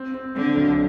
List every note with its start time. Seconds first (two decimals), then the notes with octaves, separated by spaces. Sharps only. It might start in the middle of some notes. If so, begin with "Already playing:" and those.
Already playing: C4
0.14 C4
0.35 D3 C4
0.56 B1